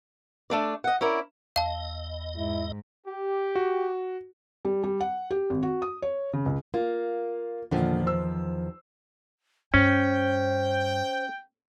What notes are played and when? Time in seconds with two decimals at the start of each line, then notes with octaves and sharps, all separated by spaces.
0.50 A3 D4 D5
0.84 D#5 F#5
1.01 C#4 E4 A#4 D5
1.56 E2 D#5 F5 A5
2.37 G#2 E4
3.07 G4
3.55 F#4
4.65 G3
4.83 G3
5.01 F#5
5.31 G4
5.50 G#1
5.63 F#4
5.82 D#6
6.02 C#5
6.33 C#3
6.46 C#2
6.74 A#3 F4
7.71 E2 A#2 D3 D#3 F3
8.06 C5 E6
9.74 G2 C#4 C5 G5